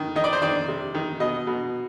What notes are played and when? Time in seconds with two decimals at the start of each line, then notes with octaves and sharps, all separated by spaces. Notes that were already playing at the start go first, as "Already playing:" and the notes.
Already playing: D#3
0.15 D#3 D#5
0.24 D5
0.33 C5
0.42 D#3 D5
0.68 C3
0.94 D#3
1.20 B2 D#5
1.47 B2